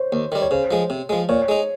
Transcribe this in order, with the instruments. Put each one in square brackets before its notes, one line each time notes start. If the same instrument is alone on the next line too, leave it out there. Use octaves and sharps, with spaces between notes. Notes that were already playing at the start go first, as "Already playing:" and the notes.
Already playing: [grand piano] C5 C#5
[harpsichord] D#2
D#3 G3
[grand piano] C#5
[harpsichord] C#3 [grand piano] C5
[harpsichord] F3 G#3
C3
F3 G#3
[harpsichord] A#2 [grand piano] C#5
[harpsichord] G#3 D#4